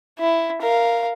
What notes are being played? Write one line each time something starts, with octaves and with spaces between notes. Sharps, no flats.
E4
A#4 F5